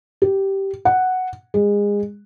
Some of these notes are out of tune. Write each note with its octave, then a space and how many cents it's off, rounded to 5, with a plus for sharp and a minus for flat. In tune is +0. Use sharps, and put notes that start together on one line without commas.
G4 -10
F#5 +0
G#3 -25